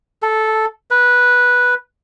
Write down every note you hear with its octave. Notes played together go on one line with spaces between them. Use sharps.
A4
B4